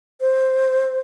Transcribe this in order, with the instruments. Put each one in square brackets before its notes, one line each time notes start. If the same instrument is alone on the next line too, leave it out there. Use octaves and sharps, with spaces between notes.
[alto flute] C5